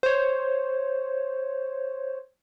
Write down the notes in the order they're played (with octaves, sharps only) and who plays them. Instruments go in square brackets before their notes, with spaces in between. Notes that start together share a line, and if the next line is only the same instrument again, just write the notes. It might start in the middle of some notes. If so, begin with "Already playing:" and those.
[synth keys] C5 C#5